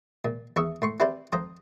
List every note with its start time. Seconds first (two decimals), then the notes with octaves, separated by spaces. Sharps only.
0.25 A#2
0.56 E2 E4 E5 C#6 D#6
0.82 A2 C6 C#6
1.00 C4 E4 G4 B4 C5 D5
1.32 F2 C5 A#5 D#6